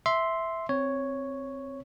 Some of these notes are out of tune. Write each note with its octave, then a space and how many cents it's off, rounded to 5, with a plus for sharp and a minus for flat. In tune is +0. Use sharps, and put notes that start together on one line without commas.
E5 -5 C6 +0
C4 +0 C#5 +0